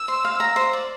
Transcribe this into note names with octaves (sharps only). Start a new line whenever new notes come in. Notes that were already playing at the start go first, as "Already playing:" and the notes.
Already playing: E6
C5
F5
A#5
C5
D5